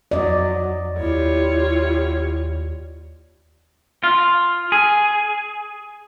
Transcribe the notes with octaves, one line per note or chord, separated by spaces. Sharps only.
F2 F#3 D5 D#5
D#2 E4 F4 G4 C#5
F4
G#4